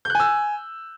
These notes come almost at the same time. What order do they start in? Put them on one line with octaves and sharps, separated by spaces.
G6 F#6 G#5 E6